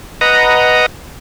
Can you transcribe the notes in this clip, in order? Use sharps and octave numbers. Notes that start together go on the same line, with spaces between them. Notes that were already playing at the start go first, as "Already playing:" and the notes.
B4 D#5 F#5 A#5